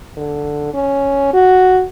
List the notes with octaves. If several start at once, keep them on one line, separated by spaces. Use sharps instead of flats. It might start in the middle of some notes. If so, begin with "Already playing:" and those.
D3
C#4
F#4